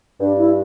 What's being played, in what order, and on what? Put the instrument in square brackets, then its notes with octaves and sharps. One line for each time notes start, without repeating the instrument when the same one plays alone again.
[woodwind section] G2 [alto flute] D4
[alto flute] E4